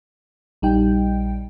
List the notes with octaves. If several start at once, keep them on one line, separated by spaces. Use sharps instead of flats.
A#1 G3 D#4 G5